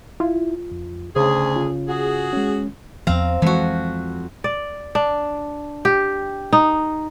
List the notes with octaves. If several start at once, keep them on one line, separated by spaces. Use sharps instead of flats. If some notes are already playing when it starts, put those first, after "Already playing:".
E4 F4
F2
D2 C#3 G#4 C5
C#4 F4
F#4 G#4
G#3 C#4
E2 F3 C4 F5 A#5
F2 E3 G#3 F#4
D5
D4
G4
D#4